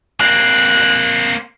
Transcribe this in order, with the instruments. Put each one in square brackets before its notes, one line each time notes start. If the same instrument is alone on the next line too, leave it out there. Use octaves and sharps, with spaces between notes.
[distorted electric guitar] A#3 C4 [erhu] F#6